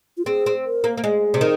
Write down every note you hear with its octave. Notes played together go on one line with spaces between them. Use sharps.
F4
C4 G#4
C4
A#4
A#3
A#3
G#3 G#4
C3
D#3